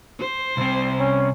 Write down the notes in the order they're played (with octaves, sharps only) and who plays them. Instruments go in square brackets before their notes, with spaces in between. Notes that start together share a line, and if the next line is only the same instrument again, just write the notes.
[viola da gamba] C5
[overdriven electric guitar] C2 C3
[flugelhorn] C#4